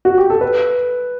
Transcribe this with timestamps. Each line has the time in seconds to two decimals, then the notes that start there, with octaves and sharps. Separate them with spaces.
0.05 F#4
0.18 G4
0.30 A4
0.41 B4